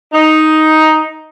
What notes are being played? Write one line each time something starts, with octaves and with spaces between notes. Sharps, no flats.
D#4